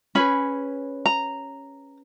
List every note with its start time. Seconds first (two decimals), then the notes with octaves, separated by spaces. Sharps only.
0.15 C#4 G#4 B4 B5
1.06 A#5